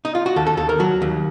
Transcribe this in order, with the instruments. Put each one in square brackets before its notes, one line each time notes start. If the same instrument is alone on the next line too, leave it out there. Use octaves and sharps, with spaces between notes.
[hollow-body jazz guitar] D#4
F4
F#4
D#2 A4
A4
D#2 A4
A#4
F#3 F#4
D#2